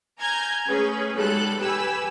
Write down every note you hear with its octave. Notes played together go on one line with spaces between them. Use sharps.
G#5 A#5 F6 G6 G#6 A#6
A3 C#4 G#4 B4
B1 G3 G#3 A4 F#6
G4 B4 G#5 B5 E6